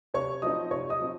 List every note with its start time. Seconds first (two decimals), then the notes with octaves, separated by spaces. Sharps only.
0.14 C3 C#5 C#6
0.42 F3 C4 D#4 D#5 D#6
0.71 C3 C#5 C#6
0.89 D#5 D#6
0.99 F3 C4 D#4